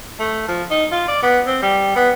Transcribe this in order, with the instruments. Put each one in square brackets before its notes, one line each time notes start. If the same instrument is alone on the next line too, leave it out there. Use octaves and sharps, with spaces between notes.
[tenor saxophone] A3
F3
D#4
F4
D5
B3
C4
G3
B3